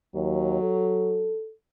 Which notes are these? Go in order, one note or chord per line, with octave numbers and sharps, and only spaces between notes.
D#2 F#3
A4